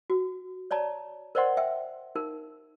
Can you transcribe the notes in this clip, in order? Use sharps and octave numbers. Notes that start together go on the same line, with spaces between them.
F#4
C#5 D5 A5 A#5
A#4 C5 D5 D#5 F#5 C6
E5 G5
D#4 A#4